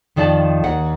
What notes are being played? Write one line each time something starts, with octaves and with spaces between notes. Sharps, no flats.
F2 D#3 F3 D5 A5
D#2 F#5